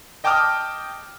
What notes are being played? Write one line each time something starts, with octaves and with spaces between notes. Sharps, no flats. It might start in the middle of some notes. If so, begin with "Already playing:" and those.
D#5 G5 A5 D6 D#6 F6